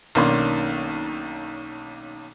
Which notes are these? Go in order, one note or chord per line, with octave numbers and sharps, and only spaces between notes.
B1 D#3 A#3 C#4 D4 C6